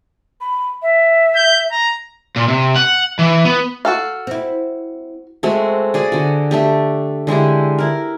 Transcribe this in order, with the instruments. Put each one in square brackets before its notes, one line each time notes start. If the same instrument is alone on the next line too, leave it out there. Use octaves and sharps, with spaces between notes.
[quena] B5
E5
[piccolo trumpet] G6
A#5
[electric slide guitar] A#2
C3
F#5
E3
B3
[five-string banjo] F#4 A4 F5
[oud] C4 E4
[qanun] G#3 A3 C4 F#4
F#4 G#4 D5
D3 F#4
A3 D4 G4
D3 G#3 E4 G4
E4 A#4